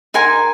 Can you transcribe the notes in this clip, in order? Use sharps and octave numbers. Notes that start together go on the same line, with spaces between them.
D#4 A#4 G#5 C6